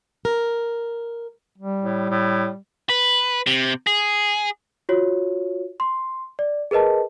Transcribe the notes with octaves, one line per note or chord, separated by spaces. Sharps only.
A#4
G3
A2
A2
B4
C3
G#4
F4 F#4 C#5
C6
D5
G#4 A#4 B4 D#5 A5